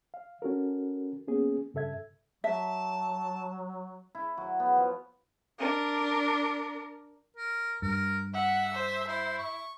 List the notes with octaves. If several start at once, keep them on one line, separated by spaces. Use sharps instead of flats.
F5
C#4 F#4 A4 A#4
A#3 B3 C#4 G#4
G2 C#3 A4 E5 G#6
F#3 E5 A5
E4
F#3
B3
F3
D4 A#4
A#4
G2 A#4
E5 F#5
C5
E4 C5
C#6